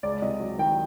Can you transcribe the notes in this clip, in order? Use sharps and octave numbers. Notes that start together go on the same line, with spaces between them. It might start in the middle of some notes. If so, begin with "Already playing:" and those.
C#2 D5
C3 D#5
F#3
D#3 G5